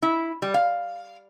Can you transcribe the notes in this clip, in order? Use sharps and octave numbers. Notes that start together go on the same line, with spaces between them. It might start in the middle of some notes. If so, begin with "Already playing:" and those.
E4
G3
F5